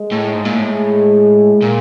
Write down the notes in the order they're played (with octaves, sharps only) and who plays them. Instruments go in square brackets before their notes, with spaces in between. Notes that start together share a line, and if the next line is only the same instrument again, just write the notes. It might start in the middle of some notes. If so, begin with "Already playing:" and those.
Already playing: [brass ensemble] G#3
[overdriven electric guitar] A2
G#2
A#2
A2
A#2